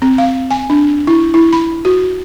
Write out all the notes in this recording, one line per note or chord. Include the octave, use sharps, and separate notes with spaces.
C4
F5
G#5
D4
E4
E4
B5
F#4